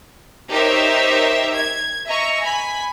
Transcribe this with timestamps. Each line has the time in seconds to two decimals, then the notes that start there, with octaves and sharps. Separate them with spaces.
0.51 D#4 G4 A#4 C5 C#5 E5
1.57 G#6
2.06 D#5 E5 A#5 C#6
2.40 G#5 B5